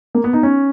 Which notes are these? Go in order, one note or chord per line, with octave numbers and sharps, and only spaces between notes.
A#3
B3
D#4
C#4